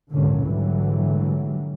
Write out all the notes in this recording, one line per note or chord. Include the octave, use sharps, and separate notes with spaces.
G#1 C#2 F#2 A#2 D3 C#4
A#1 G#2 D3 E3 F#3 G3